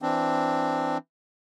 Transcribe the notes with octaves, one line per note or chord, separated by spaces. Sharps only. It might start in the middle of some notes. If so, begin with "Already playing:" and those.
E3 C4 D4